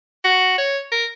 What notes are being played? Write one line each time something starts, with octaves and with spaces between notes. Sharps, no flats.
F#4
C#5
A#4